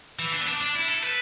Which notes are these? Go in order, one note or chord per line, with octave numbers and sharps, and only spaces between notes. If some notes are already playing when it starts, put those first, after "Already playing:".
E3
D4
B3
D4
D4
E4
A4
B4